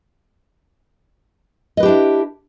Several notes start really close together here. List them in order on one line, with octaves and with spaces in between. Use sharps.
D#5 B4 G4 D4 E4